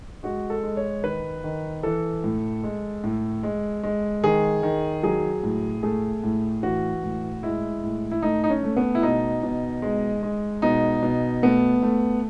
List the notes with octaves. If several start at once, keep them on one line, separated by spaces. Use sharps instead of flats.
G#3 F#4
A4
G#3
C#5
D#3 B4
D#3
E3 A4
A2
G#3
A2
G#3
G#3
D#3 G#4
D#3
F#3 G#4
A2
A3 G#4
A2
E3 F#4
A2
G#3 E4
A2
E4
A3 D#4
D#4
C#4
A3
B3
E4
B2 D#4
B2
G#3
G#3
B2 D#4
B2
A3 B3
A3